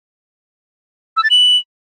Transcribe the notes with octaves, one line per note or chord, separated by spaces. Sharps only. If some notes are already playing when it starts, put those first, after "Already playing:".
E6
A6
F#7